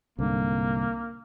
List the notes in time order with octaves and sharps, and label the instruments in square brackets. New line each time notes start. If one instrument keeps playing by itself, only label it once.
[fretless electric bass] C2 G#2 D3 [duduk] A#3